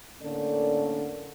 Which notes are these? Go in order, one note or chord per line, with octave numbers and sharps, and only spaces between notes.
A2 D3 A#3 C#4 A4 D5